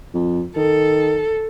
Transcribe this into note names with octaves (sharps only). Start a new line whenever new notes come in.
F2
D#3 A4